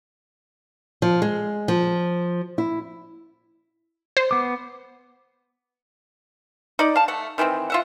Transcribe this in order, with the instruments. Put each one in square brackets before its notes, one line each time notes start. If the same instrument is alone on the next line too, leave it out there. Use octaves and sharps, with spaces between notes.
[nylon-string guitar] F3
G#3
F3
E4
[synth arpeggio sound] C5
[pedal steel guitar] B3 D6
[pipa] D#4 D5
F5 A5
A3 F#5
D#3 E3 B3 C4
F4 E5 F#5